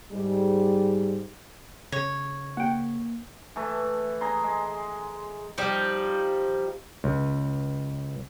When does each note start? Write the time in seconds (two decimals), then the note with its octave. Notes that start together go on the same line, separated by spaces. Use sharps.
0.12 G#2 G3 G#3
1.92 C#3 C#5
2.57 A#3 F#5 G5
3.56 E3 A3
4.21 G#4 A#5 C6
4.44 G#3
5.58 F3 G3 D#4
7.04 C#2